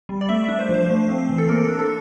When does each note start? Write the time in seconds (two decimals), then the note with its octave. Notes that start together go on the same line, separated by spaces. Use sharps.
0.09 G3
0.21 D5
0.29 A3 E5
0.44 D4 E5
0.59 C5
0.69 F3 C5
0.90 A3
1.09 C4
1.29 E3
1.38 A4
1.49 A#3 A#4
1.64 D4 A4
1.79 A4